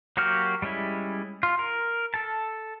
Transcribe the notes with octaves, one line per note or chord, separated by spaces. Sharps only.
F#3 A#3 F#4 G4 F6
G3 G#3 C#4 E4
F4
A#4
A4 A5